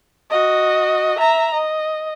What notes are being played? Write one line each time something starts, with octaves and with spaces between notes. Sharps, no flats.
F#4 D#5
E5 A#5
D#5